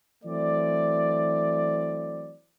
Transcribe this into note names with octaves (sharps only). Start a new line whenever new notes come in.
E3 F#3 A3 C4 D5